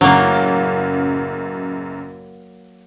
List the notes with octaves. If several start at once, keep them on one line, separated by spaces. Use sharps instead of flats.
A1 F#2 C#3 F#3 A#3